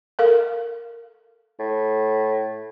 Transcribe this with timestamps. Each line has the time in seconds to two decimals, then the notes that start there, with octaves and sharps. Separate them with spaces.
0.19 A4 A#4 F5
1.59 A2